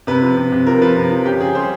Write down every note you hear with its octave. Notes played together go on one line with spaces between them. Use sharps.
C3 B4
F3
C3
C3
F3 A#4
F3 B4
C3
F3
C#3 G4
C#3 G#4
G3 C5